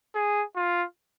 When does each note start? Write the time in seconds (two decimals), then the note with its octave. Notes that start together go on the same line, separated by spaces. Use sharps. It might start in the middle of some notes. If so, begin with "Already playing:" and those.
0.15 G#4
0.56 F4